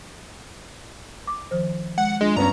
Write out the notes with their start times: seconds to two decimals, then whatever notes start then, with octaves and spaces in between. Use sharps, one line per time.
1.27 D6
1.51 D#3 F3 C5
1.98 G#3 F#5
2.21 G#3 D4 F4
2.36 G2 B3 C#4 A#5